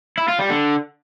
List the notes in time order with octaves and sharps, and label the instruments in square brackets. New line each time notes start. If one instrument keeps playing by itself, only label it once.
[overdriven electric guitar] E4
F4
G3
D3